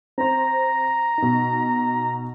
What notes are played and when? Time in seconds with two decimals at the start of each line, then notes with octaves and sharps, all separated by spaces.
0.18 C4 C5 A#5
1.18 B2 D#4